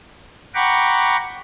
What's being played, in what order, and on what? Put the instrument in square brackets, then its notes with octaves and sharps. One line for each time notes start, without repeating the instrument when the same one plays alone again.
[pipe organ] F#5 G5 A#5 B5 C#6 D6